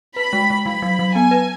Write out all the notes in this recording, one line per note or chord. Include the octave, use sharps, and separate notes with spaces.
B4 B5
G#3
G#3
F#3 B5
F#3
F#3
B3 G#5
B4